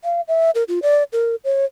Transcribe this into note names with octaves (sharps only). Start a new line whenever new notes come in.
F5
E5
A#4
F4
D5
A#4
C#5